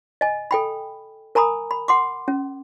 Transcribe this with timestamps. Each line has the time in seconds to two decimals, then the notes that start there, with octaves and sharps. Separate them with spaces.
0.21 D#5 G#5
0.51 A4 G5 B5
1.35 A#4 G#5 A#5 B5 D#6
1.71 B5
1.88 F#5 C6 D6
2.28 C#4